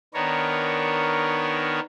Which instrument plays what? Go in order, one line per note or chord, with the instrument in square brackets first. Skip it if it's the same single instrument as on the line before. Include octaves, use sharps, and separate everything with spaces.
[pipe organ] D#3 B3 D4 A#4 C#5